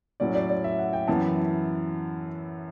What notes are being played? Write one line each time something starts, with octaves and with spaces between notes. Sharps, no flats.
A2 F#3 C#4 D5
D5
D5
E5
F#5
G5
F#2 E3 B3 A5